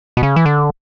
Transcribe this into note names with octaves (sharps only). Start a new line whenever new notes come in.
B2
C#3
E3
D3